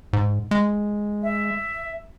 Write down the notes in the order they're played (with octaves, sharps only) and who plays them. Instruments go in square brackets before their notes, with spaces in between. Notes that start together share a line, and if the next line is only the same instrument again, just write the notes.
[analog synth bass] G#2
G#3
[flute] E5